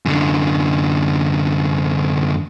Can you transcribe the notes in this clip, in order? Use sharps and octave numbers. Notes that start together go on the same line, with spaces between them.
F#2 D3